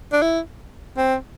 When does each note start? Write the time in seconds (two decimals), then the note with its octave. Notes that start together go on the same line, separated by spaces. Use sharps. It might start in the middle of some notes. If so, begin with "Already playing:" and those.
0.13 D4
0.22 E4
0.97 C4